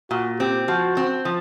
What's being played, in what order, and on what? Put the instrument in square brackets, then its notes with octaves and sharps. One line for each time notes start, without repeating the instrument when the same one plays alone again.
[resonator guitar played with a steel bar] A#2 [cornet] F#4
[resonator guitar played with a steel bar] C4 [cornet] G4
[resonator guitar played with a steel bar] F3 [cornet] F#4
[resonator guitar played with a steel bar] C4
F3